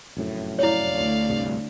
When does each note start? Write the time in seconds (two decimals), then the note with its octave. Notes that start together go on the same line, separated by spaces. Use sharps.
0.17 F1 F#2 A2
0.59 E4 C#5 D5 F5
0.89 D2
1.30 C2 G2